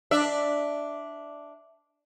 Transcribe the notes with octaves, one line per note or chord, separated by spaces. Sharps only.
D4 E5